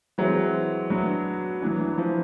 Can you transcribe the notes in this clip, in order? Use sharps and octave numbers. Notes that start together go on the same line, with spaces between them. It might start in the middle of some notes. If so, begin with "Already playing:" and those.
E3 F#3 G#3 C4
F#3 B3 D4 F#4
E3 F#3 B3 D4
E3
F3